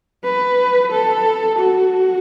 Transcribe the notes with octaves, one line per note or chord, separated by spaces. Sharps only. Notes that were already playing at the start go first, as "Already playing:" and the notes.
B4
A4
F#4